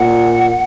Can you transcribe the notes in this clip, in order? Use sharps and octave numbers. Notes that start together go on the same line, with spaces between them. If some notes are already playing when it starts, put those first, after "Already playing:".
Already playing: A#2 F#5